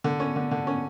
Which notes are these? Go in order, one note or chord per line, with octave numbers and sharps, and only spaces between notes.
D3
C#4
D3
D3
C#4